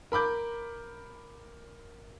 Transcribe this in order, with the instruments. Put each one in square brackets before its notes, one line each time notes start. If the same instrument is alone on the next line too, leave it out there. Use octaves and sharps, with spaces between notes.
[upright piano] A#4 B5 D6 G6